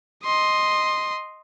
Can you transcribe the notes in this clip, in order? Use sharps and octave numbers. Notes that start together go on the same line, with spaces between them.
D#5 C6